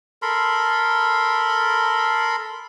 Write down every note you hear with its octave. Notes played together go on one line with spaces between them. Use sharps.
A4 A#4 B5 C6